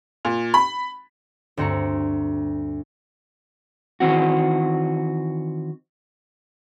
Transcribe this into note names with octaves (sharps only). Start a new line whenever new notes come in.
A#2
B5
D2 G2 C4 F#4 A#5 C#7
D#3 E3 C4 F#4